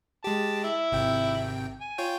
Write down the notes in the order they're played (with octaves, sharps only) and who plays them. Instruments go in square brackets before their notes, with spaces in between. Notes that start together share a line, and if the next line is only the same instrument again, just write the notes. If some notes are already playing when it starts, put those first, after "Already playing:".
[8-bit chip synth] G#3 G4 [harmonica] A5
[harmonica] E4
[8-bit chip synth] G#1 C3 G5
[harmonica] G#5
[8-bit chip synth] F4 C#5 G5